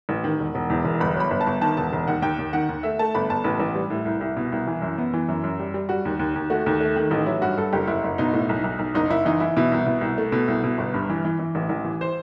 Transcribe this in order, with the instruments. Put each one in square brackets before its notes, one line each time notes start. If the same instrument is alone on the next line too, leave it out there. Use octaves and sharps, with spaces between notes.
[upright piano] A1
D#3
E1
E1
E2
E1
G1 B5
F#3 B5
G1
A5
G1
D#3 A5
E1 A5
E1
D#2 F#5
D#2 G5
D#2
D#3 F#5
D#2
A3 E5
A3 A5
G1 B5
G1 A5
A1 B4
A1
G3
A2
C2
C2
B2
C2
E3
F#2
B3
E3
F#2
F#2
G3
G3
G3 F#4
D#2
D#2
D#2
A3 F#4
D#2
A3
D#3
A1 D#4
F#3 E4
G2 F#4
G2 A4
F#1 G4
F#1 E4
F#1
B2 D#4
A2
B1
B1
B1
F#1 D#4
F#1 E4
E3 D#4
E3 E4
B2 E4
C2
B2
C2
A3
B2
C2
B2
G1
G2
E3
E3
E3
A1
A1
E3
C5